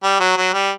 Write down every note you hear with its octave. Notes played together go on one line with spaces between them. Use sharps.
G3
F#3
F#3
G3